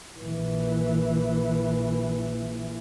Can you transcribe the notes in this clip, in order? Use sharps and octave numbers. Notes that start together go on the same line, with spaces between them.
A#1 E3